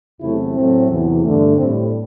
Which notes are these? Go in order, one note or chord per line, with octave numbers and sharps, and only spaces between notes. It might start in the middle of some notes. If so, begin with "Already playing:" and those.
E2 C3 F#3 A3 E4
A2 F#3 A3 C4
E2 C3 E3
G2 D3 A3
A2 G3 C4